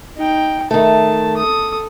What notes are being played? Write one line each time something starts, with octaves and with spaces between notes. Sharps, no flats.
D#4 G5
D#3 A3 A5
A4 D#6